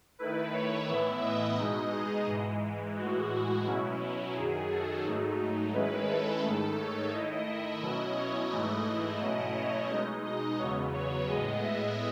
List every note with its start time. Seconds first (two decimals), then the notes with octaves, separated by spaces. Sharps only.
0.19 D#3 A3 E4 B4
0.53 C#5
0.88 A2 E3 B3 E4 E5
1.23 D#5
1.57 B2 G#3 D#4 D#5
1.92 G#4
2.27 G#2 E3 G#3
2.96 A2 E3 G#3 F#4
3.31 F#4
3.65 B2 F#3 C#4 E4
4.34 F#2 D#3 F#3 G#4
4.70 A4
5.04 G#2 F#3 A3 D#4
5.74 D#3 G#3 C#4 E4 B4
6.09 A4
6.42 G#2 D#3 A3 A4
6.78 C#5
7.12 D#3 A3 E4 D#5
7.47 E5
7.82 B2 F#3 C#4 E4 D#5
8.17 C#5
8.51 G#2 E3 A3 E4 D#5
9.20 B2 F#3 A3 C#4 E4 D#5
9.54 C#5
9.89 B2 G#3 D#4 D#5
10.24 D#5
10.58 E2 C#3 F#3 B3 C#5
10.93 C#5
11.28 A2 G#3 B3 D#5
11.63 E5